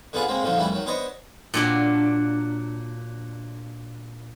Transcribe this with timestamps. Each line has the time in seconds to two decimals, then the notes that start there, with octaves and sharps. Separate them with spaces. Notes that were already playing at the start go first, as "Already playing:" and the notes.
0.13 D3 B3 F4 G#4 D5
0.28 C#3 G#3 A#3 C4
0.42 A#2 D3 D#3 F3 F#3
0.57 F2 E3 G3 A3 E4
0.72 D#3 F#3
0.86 B3 D4 C5 C#5 D#5
1.54 A#2 F#3 D4